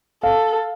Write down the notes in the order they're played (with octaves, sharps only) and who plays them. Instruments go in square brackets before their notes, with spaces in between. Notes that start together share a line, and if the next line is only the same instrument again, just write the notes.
[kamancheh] A4 [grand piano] F5